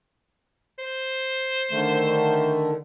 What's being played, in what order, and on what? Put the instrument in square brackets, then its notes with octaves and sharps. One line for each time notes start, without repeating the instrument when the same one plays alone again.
[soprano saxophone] C5
[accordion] D3 D#3 A3